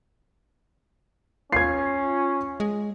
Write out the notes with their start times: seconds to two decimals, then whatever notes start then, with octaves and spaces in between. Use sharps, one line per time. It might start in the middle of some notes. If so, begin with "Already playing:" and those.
1.52 C#4 F4 G#6 C7
2.60 G#3